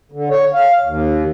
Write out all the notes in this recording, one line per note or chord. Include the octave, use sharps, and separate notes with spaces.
D3
C#5
F5
D#2